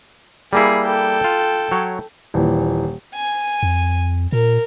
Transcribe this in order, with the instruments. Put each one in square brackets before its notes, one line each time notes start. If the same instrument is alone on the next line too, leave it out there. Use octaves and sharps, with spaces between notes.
[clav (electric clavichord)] G3 A#3 E4 [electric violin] G#4 C7
[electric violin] A4 G5
[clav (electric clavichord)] F4
F#3 C#5
[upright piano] D#1 A#2 E3
[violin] G#5
[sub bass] F2
[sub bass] A#2 [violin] A#4